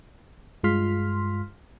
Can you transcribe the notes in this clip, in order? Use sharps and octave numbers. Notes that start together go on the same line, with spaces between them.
G2 G#3 F4 C6 F6 B6